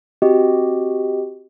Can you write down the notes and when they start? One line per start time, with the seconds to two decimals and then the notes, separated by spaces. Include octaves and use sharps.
0.22 C4 F#4 G4 D#5